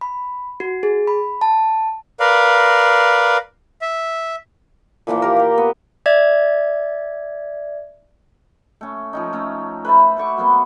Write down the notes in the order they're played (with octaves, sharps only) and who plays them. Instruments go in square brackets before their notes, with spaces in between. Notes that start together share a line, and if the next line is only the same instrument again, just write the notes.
[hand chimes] B5
F#4
G#4
B5
A5
[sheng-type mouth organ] A#4 B4 D5 F5
E5
[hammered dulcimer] A#2 E3 F3 A#3
G4 A#4
F5 G5
B3
[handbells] D5 E5 G#6
[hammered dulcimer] A3 C#4
F3 C#4 D#4
A3 C#4
B4 C5 E5 A5
A3 F#4 C#6 D6
F#3 A#3 B3 C6